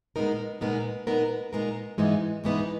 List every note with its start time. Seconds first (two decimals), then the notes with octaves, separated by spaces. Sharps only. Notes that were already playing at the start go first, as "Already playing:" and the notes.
0.16 A#2 G#3 B3 D#4 A#4
0.61 A#2 G#3 B3 D#4 A#4
1.07 A#2 G#3 B3 D#4 A#4
1.53 A#2 G#3 B3 D#4 A#4
1.98 G#2 E3 G#3 B3 D#4
2.44 G#2 E3 G#3 B3 D#4